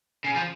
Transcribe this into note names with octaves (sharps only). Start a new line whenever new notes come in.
C#3
F3